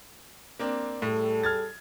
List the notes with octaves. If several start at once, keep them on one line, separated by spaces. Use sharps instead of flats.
A#3 C4 D4
A2 G3 G#4 A4
F6 G#6 A6